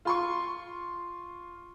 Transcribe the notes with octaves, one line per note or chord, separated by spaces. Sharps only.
F4 C6 C#6